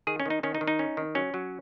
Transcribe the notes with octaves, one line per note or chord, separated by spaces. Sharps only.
D#3 G#4
C#4
D#3 D#4
D#3 C#4
D#4
D#3
D#4
C#4
D#3
F#3 C#4
F#3